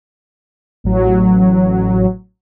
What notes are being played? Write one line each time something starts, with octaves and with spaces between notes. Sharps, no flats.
A1 F#3